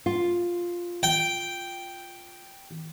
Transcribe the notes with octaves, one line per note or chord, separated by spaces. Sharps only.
F4
G5